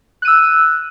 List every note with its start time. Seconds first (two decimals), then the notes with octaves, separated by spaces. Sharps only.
0.22 F#6
0.25 D#7
0.28 E6